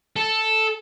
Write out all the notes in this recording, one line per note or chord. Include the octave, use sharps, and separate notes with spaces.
A4